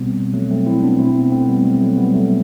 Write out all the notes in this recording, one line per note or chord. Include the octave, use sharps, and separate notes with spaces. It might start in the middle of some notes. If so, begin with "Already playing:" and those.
Already playing: B2 G3 B3 C4
F#3 A3
A3 C4
C4 E4
B3 D4
B2 C4 E4
B3 D4
A3 C4
G3 B3
F#3 A3
F#3 A3
G3 B3
F#3 A3